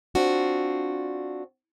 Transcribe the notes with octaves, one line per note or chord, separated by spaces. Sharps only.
C4 D4 F4 F#4